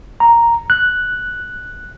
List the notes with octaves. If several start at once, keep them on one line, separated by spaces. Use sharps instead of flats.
A#5
F#6